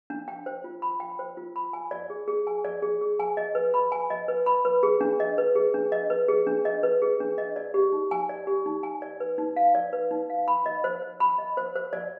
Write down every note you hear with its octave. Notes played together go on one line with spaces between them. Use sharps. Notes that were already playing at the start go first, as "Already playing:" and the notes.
D4
G5
C5
F4
B5
G5
C5
F4
B5
G#5
D5
G#4
G#4
G#5
D5
G#4
G#4
G#5
D#5
B4
B5
G#5
D#5
B4
B5
B4
G#4
D4
D#5
B4
G#4
D4
D#5
B4
G#4
D4
D#5
B4
G#4
D4
D#5
D5
G4
D#4
G#5
D5
G4
D#4
G#5
D5
B4
D#4
F5
D5
B4
D#4
F5
B5
D#5
C5
C5
B5
D#5
C5
C5
D5